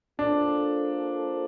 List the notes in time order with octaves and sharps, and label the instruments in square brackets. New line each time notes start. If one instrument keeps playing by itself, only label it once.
[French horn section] A#3 F4 A4 C5 [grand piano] D4